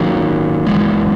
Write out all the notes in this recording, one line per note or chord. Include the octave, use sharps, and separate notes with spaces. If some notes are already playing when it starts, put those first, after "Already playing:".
Already playing: D#3 F#3 A#3
F#2 C#3 E3 G#3